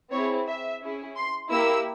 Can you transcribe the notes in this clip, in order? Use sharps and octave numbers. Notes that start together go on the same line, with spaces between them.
C4 E4 G#4 C#5
E5
C#4 E4 G#4
C6
A#3 E4 G4 E6